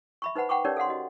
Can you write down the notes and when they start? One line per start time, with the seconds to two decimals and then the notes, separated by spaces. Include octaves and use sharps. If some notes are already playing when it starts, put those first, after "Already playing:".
0.22 E5 B5 C#6
0.35 D#4 B4 C5 F#5 B5
0.49 F#5 G5 B5 C#6 D6
0.65 C#4 D#4 G4 A#4 C#5 D5
0.77 A4 F5 F#5 C6
0.89 F#4 D#5